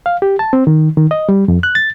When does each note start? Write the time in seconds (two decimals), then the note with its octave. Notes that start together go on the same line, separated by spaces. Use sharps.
0.06 F5
0.22 G4
0.39 A5
0.53 C4
0.67 D#3
0.97 D#3
1.11 D#5
1.29 G3
1.48 F2
1.63 F#6
1.75 A6